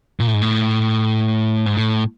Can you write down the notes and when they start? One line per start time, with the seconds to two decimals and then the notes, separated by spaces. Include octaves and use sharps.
0.20 A#2
0.27 A2
0.34 G#2
0.42 A2
1.66 G#2
1.77 A2